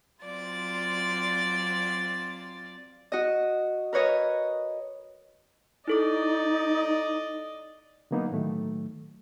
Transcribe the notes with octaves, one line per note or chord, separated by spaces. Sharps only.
F#3 C4 F4 D5 A6
F#4 D#5
A#4 B4 C#5 D#5
D#4 E4 A4 D5 D#5 D6
D3 F#3 A#3 B3 D#4
A2 D#3 F#3 A3